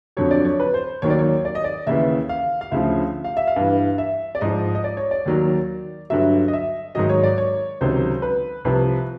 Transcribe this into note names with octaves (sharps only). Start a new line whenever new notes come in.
F2 D3 F#3 C#5
D5
C#5
B4
C5
D#2 D#3 F#3 C#5
D5
C#5
D5
D#5
D5
D#2 C#3 E3 E5
F5
F5
D2 C#3 F3 E5
F5
E5
F5
G2 E3
E5
D5
G#2 F3 D#5
D#5
D5
C#5
D5
D#2 D#3 F#3
G2 D3 F#3 E5
D#5
E5
G#2 D#3 F#3 D#5
C#5
D5
C#5
C#2 C3 D#3 F#3 C5
B4
C2 C3 F3 B4